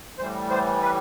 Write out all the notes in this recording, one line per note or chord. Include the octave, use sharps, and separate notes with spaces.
A2 E3 G3 C5
C5
B4